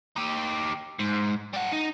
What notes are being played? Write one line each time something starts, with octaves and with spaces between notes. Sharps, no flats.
D#4 G4
G#2
G3 F#5
D#4